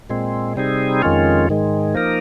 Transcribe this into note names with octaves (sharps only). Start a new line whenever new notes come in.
A#2 G#3 C4
C3 G3 C4 D#4 G#4
F2 D#3 G#3 C#4 F4
G#2 D#3 G#3
F3 A#3 D#4 A#4